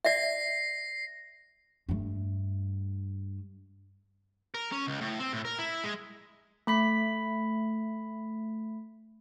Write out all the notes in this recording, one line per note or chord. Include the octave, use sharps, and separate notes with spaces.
D5 E5 A#6 C7
G2 A3
A#4
C#4
C#2
A2
C4
A2
A#4
E4
G#3
A3 B5 B6